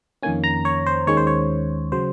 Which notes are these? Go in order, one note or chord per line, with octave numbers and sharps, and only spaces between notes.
F2 D#3 A#3 C#4 G#5
A#5
C#5
C5
D#2 D#3 G#3 C#4 C#5
C5
C#5
C#3 F#3 C5